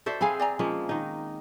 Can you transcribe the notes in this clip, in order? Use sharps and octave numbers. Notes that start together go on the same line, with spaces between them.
F#4 A4 C5 D5 E5
C4 G#4 F5 G#5 B5
D5 G#5 A#5
F3 G#3 A#3 C#4
D#3 D#4